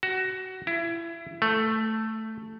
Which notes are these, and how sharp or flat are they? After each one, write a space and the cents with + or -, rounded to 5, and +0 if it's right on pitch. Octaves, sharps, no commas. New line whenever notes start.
F#4 +20
E4 +30
A3 +5